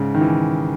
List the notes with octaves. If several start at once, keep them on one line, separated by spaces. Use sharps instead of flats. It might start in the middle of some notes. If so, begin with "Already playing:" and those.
Already playing: G#2 C#3
D#3
E3